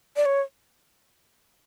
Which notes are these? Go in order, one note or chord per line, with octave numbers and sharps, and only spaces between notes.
D5
C#5